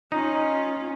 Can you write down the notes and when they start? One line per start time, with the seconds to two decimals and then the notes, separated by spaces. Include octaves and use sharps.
0.12 C#4 D#4 F4